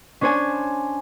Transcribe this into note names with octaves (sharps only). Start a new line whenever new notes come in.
C#4 D4 C5 C#5 G#5